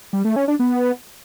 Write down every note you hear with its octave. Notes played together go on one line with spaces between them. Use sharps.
G3
A3
C#4
D4
B3